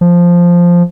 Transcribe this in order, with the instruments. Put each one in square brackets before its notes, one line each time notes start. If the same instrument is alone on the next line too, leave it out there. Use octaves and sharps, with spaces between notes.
[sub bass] F3